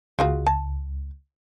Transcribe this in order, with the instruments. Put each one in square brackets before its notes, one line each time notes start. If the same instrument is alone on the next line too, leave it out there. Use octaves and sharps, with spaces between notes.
[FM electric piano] C#2 [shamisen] G#3 F4 F#4
[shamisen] A5